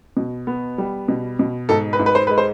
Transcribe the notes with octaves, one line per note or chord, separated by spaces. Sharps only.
B2
B3
G3
B2
B2
G#2 A4
B4
G#2
B4
C5
G#3 B4
C5